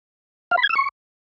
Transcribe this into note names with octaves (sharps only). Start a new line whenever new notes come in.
F5
B5
G#6
E6
C#6